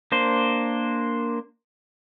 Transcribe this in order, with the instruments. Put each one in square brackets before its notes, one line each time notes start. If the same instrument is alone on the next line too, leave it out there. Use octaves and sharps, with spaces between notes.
[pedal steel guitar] A#3 D4 C5